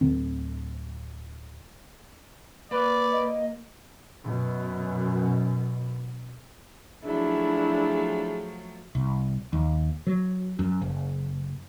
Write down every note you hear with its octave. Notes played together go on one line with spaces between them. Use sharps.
D1 C#2 D3 C4
A#3 B4 D5
D#5
F#2 B2
F3 F#3 A3 D4 E4 G#4
C2
D#2
F#3
F#2
F#1